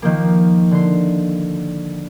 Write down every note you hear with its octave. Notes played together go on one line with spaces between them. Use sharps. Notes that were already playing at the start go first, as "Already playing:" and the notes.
D#3 F3 A#3
D3 C6